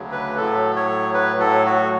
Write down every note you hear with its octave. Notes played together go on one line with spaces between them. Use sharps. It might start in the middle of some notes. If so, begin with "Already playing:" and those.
Already playing: D2 C#3 F#3
B4
A2 F#3 A4
C#5
B4
A4
F#4